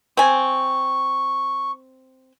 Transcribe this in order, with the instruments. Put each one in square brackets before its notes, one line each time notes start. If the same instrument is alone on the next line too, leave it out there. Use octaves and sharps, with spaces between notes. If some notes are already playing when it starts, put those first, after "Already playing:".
[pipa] C4 G#5 [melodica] C#6